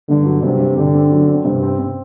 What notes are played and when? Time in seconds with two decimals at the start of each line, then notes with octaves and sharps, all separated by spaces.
0.08 G2 D3
0.26 F#3
0.43 G2 C3
0.59 G2
0.77 D3 G4
0.94 C4
1.12 F#3
1.28 C4
1.45 G2 C3
1.63 C4
1.79 C4